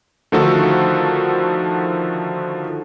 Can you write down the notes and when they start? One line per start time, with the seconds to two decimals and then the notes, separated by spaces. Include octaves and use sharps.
0.32 D3 D#3 F3 A3 F#4 A4